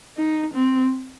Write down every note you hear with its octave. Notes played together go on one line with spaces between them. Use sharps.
D#4
C4